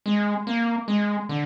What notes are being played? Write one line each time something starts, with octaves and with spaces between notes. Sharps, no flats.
G#3
A#3
G#3
D3